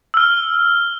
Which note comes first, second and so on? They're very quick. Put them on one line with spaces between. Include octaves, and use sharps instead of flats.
E6 F6 G7